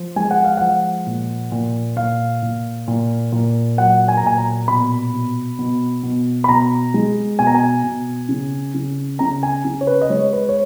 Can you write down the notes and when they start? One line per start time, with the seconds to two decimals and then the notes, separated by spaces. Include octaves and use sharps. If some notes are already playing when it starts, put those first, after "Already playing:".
Already playing: F3
0.16 G#3 G#5
0.31 F#5
0.44 F5
0.57 F3 F#5
1.06 A#2
1.52 A#2
1.96 A#2 F5
2.42 A#2
2.88 A#2
3.32 A#2
3.78 F#3 F#5
4.08 G#5
4.17 A#5
4.23 A#2 G#5
4.38 A#5
4.68 B2 B5
5.13 B2
5.59 B2
6.03 B2
6.44 B5
6.49 B2 A#5
6.94 G#3
7.39 B2 G#5
7.47 A#5
7.55 G#5
7.84 B2
8.29 C#3
8.74 C#3
9.19 C#3 A#5
9.43 G#5
9.65 C#3
9.81 C#5
9.87 B4
10.01 D#5
10.10 G#3 C#5
10.33 B4
10.49 C#5